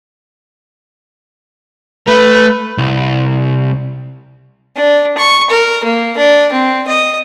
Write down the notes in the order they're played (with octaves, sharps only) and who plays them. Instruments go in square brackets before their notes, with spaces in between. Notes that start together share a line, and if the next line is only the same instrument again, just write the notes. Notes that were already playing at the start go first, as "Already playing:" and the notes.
[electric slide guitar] A3 [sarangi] B4
[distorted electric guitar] C2
[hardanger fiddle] D4
C#6
A#4
A#3
D4
C4
D#5